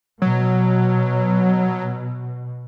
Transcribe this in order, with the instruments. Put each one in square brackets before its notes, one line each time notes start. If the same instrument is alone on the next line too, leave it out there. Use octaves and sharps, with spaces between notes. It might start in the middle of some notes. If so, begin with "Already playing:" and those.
[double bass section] B2 [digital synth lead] F#3